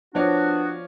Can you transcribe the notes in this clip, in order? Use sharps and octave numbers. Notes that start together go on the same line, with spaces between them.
F3 B3 D4 F#4 C#5 D5